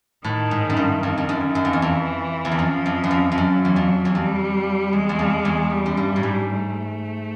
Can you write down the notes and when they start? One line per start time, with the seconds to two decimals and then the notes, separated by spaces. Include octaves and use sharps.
0.24 A2 D#3
0.51 G#2
0.70 F#2
0.77 G2
1.03 F2 D#3
1.18 F2
1.29 F#2
1.55 F#2
1.65 F2
1.73 E2
1.81 F2 E3
2.45 E2
2.52 F2
2.59 F#2 F3
2.86 F2
3.04 F#2
3.11 F2
3.32 F2
3.37 F#2 F#3
3.65 E2
3.76 F2
4.05 E2
4.15 F2 G3
4.93 E2 G#3
5.09 E2
5.19 F2
5.45 E2
5.72 G3
5.86 F#2
5.97 G2
6.16 A2
6.23 G#2
6.50 A3